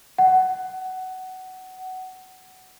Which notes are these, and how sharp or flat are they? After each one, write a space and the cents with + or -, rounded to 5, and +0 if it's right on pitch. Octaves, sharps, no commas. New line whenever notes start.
F#5 +15